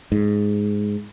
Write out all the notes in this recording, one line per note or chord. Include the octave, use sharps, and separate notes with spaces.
G#2